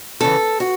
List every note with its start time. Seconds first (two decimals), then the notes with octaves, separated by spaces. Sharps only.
0.21 E2 C#3 E3 A4
0.60 F#4